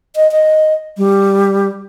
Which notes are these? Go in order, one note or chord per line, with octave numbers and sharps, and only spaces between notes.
D#5
D#5
G3